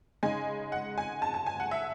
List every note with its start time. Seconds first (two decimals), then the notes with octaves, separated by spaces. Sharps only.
0.23 C#3 G#3 D#4 G#5
0.72 F#5
0.98 G#5
1.22 A5
1.34 A5
1.46 G#5
1.60 F#5
1.71 E5